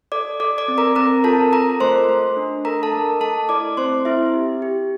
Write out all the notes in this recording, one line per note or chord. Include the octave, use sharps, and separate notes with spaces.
A4 D5 D6
A4 D5 D6
D5 D6
C4
A#4 A#5
C4 A#4 A#5
F4 A4 A5
A4 A#4 A#5
A3 C5 C6
A3
D4
A4 A#4 A#5
A4 A5
A3
A3 A4 A5
E4 D5 D6
C4 C5 C6
C4 E4 E5
G4
G4